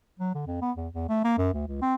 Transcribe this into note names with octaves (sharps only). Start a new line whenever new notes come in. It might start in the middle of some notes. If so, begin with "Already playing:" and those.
F#3
D3
F2
B3
E2
E2
A3
A#3
F#2
D2
C#2
C4